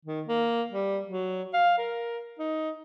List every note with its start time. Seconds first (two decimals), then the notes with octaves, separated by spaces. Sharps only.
0.05 D#3
0.28 A#3
0.72 G3
1.06 F#3
1.54 F5
1.78 A#4
2.39 D#4